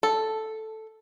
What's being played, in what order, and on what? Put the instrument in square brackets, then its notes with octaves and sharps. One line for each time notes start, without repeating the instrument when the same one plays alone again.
[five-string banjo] A4